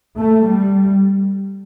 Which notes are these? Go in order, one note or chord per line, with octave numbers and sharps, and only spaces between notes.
A3
G3